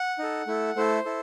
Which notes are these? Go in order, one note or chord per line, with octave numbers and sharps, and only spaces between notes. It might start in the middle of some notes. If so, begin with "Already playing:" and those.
Already playing: F#5
D#4 A4
A3 E4 A4
A3 E4 A4 C5
E4 A4